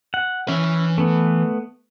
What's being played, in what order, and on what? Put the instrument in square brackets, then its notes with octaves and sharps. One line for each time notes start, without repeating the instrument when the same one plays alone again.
[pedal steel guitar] F#5
[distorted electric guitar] E3 E5 [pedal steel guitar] C#4
[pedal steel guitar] A3 B3